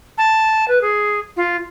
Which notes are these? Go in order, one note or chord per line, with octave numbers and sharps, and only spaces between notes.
A5
B4
G#4
F4